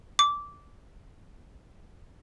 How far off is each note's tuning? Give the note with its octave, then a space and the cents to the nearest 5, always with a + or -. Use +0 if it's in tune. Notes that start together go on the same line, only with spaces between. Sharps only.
D6 -15